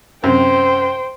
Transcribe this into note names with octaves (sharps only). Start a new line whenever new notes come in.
F#2 C3 C5 G5